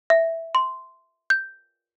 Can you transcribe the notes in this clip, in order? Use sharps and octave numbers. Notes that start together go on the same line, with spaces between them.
E5
C6
G6